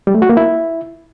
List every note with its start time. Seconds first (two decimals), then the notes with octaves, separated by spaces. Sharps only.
0.07 G3
0.15 A3
0.22 F#4
0.29 A#3
0.37 E4